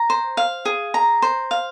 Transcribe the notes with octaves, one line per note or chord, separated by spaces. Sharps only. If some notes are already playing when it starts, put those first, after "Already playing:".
Already playing: A#5
C5
F5
G#4
A#5
C5
F5